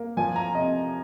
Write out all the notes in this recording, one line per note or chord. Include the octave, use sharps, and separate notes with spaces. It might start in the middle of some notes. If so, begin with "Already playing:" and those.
Already playing: A#3
F3 G#5
A#5
C3 D#5